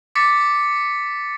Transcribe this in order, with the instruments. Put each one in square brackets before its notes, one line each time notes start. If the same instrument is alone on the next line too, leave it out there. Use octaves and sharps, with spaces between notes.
[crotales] D6 A6 B6 C#7